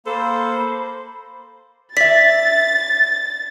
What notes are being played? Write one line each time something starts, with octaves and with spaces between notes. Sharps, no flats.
A#3 A4 C5 B5
D5 E5 A6 B6